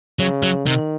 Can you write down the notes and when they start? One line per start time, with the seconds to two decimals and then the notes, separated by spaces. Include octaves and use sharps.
0.19 C#3 F#3
0.43 F#3
0.66 C3 D#3